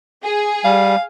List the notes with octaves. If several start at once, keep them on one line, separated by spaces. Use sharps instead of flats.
G#4
G3 F5